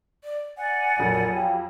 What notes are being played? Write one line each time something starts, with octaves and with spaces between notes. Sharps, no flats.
D5
D5 F#5 G#5
B1 F2 A#2 F#3
F4 G4